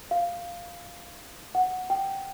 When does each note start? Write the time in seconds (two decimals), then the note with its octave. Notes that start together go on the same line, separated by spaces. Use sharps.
0.11 F5
1.55 F#5
1.90 G5